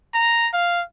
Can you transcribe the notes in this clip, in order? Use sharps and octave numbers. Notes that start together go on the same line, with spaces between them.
A#5
F5